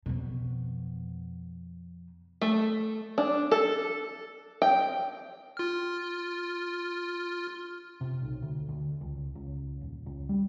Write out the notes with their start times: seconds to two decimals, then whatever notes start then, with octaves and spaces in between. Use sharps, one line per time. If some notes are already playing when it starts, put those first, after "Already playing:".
0.06 F2 B2
2.41 A3
3.18 D4
3.51 A4
4.62 G5
5.57 F4 F6
8.01 C3
8.22 B1
8.42 D2
8.69 D2
9.01 C#2
9.35 C#2
9.81 D#1
10.06 C#2
10.29 G3